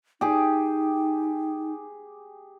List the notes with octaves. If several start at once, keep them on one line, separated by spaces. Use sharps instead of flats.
D#4 G4 G#4